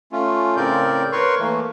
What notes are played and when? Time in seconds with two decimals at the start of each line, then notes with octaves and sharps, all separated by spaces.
0.12 A3 C#4 F4
0.57 A2 C#3 C4 A#4 D5 G6
1.12 A#4 B4 C#5 C6 C#6
1.39 E3 A3 A#3